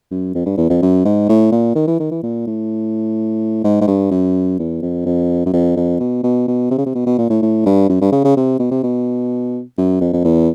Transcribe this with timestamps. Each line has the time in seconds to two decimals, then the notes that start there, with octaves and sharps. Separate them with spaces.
0.11 F#2
0.34 F2
0.46 G2
0.57 E2
0.70 F2
0.82 F#2
1.05 G#2
1.29 A2
1.52 A#2
1.75 D#3
1.88 E3
2.00 D#3
2.11 E3
2.23 A#2
2.47 A2
3.64 G#2
3.81 G#2
3.87 G2
4.11 F#2
4.59 E2
4.82 F2
5.05 F2
5.46 F#2
5.53 F2
5.76 F2
6.00 B2
6.23 B2
6.47 B2
6.71 C3
6.78 C#3
6.86 C3
6.95 B2
7.06 B2
7.18 A#2
7.30 A2
7.42 A2
7.66 G2
7.89 F#2
8.01 G2
8.12 C#3
8.24 C#3
8.36 C3
8.59 B2
8.71 C3
8.83 B2
9.78 F#2
10.01 F2
10.13 F2
10.24 E2